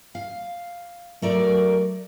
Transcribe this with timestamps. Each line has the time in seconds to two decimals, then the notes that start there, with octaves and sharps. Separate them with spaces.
0.15 F5
1.22 F#3 A3 A#4 D5